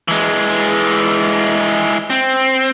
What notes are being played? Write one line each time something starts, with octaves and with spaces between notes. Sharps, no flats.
E3 G#3
C4